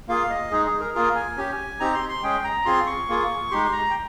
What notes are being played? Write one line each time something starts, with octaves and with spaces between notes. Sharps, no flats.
A#3 F4 G#4 F5
D#5
G#3 D#4 G#4
G#4
A#4
A#3 F4 G#4 A#4
G#5
C#4 G4
C4 D#4 G4 A#5
C6
C6
G#3 C#4 G#4 G5
A#5
C4 F4 G#4 C6
C#6
A#3 F4 G#4
G#3 D#4 G4 C6
A#5
G5